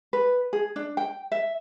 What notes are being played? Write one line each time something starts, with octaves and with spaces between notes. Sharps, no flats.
B4
G#4
D4
G5
E5